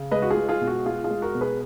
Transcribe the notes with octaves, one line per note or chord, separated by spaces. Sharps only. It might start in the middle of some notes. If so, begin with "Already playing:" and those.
Already playing: C#3
G#3 B4 D#5
F#4
F4 G#4
G#3
F4 G#4
B2
F#4
G#3 F4 G#4
F4 G#4
G#3
F#4 A#4
B2
G#4 B4